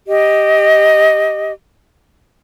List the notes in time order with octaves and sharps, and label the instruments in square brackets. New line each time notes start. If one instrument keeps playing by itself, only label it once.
[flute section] G4 D#5